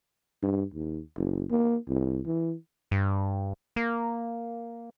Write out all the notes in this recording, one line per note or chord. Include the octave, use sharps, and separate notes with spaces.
G2
D#2
F#1
A#3
C2
E3
G2
A#3